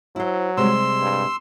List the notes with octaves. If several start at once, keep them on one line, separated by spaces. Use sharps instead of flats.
F#3 E4 C5
C3 G3 G#3 C6 E6
G2